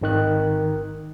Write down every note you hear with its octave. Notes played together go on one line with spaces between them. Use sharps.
G#1 D#3 F#6